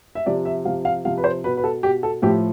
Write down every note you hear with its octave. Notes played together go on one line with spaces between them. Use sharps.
E5
C3 F3 D5
E5
C3 F3 F5
F5
C3 F3 F5
B4
C5
B2 B4
B4
A4
B2 G4
A4
A2 F3 G4